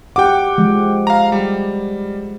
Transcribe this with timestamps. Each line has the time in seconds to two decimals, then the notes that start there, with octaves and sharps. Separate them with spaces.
0.16 G4 F#5 G5 D6
0.58 F3 G#3
1.07 F5 A#5
1.32 G3